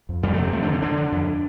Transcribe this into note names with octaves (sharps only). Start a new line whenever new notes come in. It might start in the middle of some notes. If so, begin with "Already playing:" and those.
F2
F2 G3
A3
C3
C4
F2 A3
D4
D3 C4
D3 D4
D3
F2